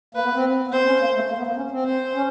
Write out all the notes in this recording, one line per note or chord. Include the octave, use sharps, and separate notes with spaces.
A#3 B4
B3
C4
B3
C4 C5
C#4
A#3
A3
A#3
B3
A#3
C#4
C4
C5
C#4